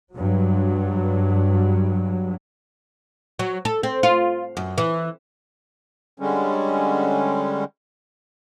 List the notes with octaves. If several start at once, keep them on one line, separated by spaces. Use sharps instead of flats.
G2 F#3
F#3
A4
C4
F4
F#2
E3
D3 G3 G#3 C#4